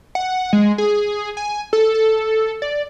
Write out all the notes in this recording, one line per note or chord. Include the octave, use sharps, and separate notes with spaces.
F#5
G#3
G#4
G#5
A4
A4
D5